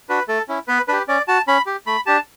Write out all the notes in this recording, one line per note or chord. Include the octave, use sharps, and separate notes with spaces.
D4 F#4 B4
A3 A4
C#4 E4
B3 B4
D4 G4 B4
C#4 D5
F#4 A5
C#4 B5
G4
A3 B5
D4 G4 A5